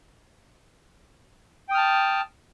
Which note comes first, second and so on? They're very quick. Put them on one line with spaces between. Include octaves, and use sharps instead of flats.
G5 D#6 F6 A5